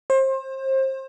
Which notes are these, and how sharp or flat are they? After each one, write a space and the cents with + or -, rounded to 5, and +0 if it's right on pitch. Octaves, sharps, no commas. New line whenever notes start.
C5 +30